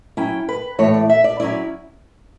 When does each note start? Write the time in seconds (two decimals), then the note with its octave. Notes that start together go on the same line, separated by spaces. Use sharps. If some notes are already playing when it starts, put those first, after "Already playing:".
0.17 F#3 C#4 E4 G5
0.49 B4
0.79 A2 E3 A3 C#5
0.94 D5
1.10 E5
1.24 D5
1.40 F#3 C#4 E4 D5